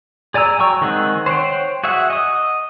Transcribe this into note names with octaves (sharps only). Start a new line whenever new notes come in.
G#4 D5 G#5 A#5 E6
F#3 G5 A#5 C#6 E6
D#3 G#3 C4 G#4 F#5
C5 C#5 F#5 G5
F#4 G#4 E5 F#5
D#5 D#6